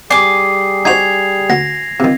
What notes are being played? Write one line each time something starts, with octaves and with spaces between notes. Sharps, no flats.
G3 G#4 D5 G#5 D6 C7
D#4 F#4 C5 G#6 C7 F7
D2 F#5 A#6
C3 D#3 F4